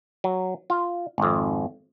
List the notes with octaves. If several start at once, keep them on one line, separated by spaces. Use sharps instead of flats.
F#3
F4
G#1 F2